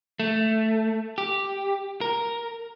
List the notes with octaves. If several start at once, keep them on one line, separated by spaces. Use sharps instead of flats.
A3
G4
A#4